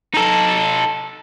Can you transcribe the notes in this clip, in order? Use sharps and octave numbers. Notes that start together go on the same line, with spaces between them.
D#4 A4